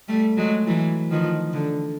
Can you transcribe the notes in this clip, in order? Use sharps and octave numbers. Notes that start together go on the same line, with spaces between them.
G3 A3
F#3 G#3
E3 F#3
D#3 F3
D3